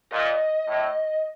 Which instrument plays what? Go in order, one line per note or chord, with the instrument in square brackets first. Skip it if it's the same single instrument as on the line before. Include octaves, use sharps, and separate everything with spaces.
[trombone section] A#2 [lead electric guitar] D#5
[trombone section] A2